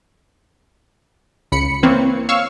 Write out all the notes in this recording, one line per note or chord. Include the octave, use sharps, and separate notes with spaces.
C#2 B5 C#7
E3 A#3 C4 B4 C#5
C#5 F5 C#6 E6